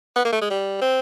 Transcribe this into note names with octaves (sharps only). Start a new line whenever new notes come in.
B3
A#3
A3
G#3
G3
C4